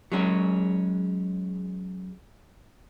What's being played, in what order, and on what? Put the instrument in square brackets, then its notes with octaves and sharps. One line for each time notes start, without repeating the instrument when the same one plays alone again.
[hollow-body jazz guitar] F#3 G#3 C#4 F#4